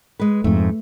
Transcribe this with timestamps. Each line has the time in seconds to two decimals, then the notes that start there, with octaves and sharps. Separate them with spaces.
0.19 G#3 B4
0.44 F2 G#2 A3